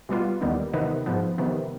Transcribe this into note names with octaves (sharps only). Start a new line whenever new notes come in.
B2 G3 B3 F4
D#2 D#3 G3 B3 D#4
C3 D#3 B3 D#4
G#2 F3 B3
C3 D#3 B3